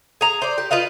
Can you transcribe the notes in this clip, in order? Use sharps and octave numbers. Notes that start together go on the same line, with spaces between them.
G#4 A#5
C5 D5
G4
F4 B4 D#5 F5